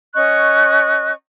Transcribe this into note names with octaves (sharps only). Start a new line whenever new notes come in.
C#4 D#5 C#6 F#6